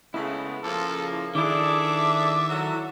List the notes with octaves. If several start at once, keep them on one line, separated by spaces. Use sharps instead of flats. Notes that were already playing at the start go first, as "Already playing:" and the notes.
C#3 G#3 A3 B3 E4
C#3 F3 A#3 A4
D#3 D4 E4 G#4 A4 E5 D6
F#3 A4